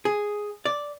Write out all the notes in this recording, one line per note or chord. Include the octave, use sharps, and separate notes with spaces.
G#4
D5